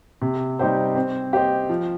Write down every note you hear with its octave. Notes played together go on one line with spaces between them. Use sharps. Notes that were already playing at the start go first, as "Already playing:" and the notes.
C3
G3 D#4 G4 C5
C4
G4 C5 D#5
F3